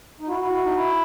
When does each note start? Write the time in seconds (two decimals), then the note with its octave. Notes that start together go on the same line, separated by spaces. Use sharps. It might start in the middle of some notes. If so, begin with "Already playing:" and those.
0.20 D#4
0.28 E4 F#4
0.40 E4
0.51 E4
0.63 D#4
0.75 E4